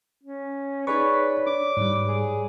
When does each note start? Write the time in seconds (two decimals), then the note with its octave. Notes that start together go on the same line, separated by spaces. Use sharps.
0.24 C#4
0.87 D#4 G#4 B4 C#5 D5 C#6
1.47 D4 D6
1.77 G#2 G3 B4
2.08 G#4